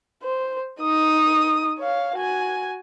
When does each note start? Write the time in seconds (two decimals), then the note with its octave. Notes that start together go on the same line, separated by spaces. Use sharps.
0.23 C5
0.81 D#4 D#6
1.79 C#5 F5
2.16 F#4 G#5